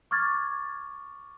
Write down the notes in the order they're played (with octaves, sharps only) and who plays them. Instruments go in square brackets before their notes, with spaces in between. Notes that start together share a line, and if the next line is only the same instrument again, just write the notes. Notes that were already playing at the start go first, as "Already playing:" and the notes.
[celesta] C#6 D6 F6 G#6 A6